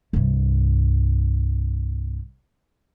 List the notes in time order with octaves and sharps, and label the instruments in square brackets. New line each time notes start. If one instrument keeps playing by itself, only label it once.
[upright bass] C2 G2